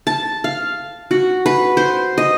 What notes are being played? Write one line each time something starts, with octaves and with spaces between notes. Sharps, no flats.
A5
F5
F#4
B4
C5
D#5